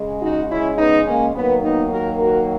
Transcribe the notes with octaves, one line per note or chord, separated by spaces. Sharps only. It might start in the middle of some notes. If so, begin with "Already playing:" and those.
Already playing: C#3 G#3
D#4 F#4
C#4 E4
B3 D#4
A#3 C#4
D#3 F#3 A#3 B3
B3 D#4
F#4 A#4
F#4 A#4